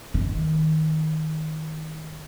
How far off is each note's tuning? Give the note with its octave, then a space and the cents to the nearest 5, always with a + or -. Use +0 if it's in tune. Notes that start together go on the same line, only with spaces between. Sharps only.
D#3 +15